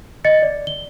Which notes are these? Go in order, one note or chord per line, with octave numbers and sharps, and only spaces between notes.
D#5 A6 C#7
D5
G7